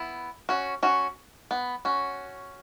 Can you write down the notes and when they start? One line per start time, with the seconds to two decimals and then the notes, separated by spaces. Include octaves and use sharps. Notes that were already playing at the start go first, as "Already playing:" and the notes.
Already playing: B3 E4
0.49 C#4 F#4
0.83 C#4 F#4
1.51 B3
1.85 C#4 F#4